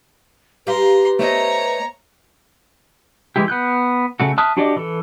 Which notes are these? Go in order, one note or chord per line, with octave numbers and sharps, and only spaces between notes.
G4 B4 F5 A#5 C6
A3 C5 C#5 D#5 A#5
E3 G#3 E4 G4
B3 F#6 G6
C#3 A3 F#4
E5 A5 D#6 F6 F#6
D4 F#4 G4 D5 D#5
E3 A4